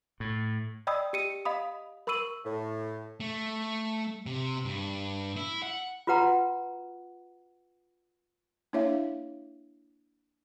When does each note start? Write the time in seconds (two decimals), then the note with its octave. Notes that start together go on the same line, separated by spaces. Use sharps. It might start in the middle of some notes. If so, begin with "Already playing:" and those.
0.20 A2
0.87 D5 D#5 G5 B5 D#6 E6
1.13 G4 C#7 D#7
1.45 D#5 F5 B5 D#6
2.07 A#4 B5 C#6 E6 D#7 F#7
2.44 A2
3.20 A3
4.26 C3
4.65 G2
5.37 E4
5.63 F#5
6.07 F4 F#4 B4 F#5 A#5
8.73 A#3 D4 E4 C#5 E5 F5